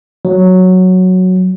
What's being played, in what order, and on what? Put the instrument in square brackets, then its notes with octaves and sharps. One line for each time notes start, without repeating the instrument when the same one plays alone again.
[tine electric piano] F#3